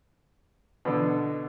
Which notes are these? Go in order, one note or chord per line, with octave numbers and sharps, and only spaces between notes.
B2 D3